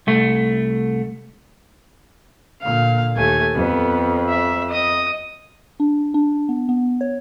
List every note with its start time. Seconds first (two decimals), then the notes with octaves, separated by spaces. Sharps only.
0.07 C2 A3
2.62 A#2 D3 F5
3.16 D#2 A3 G#5
3.55 F2 B3
4.29 E5
4.70 D#5 D#6
5.80 D4
6.14 D4
6.49 B3
6.69 B3
7.01 C#5